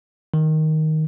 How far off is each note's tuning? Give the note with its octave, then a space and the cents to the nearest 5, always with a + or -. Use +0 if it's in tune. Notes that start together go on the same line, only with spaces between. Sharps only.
D#3 +5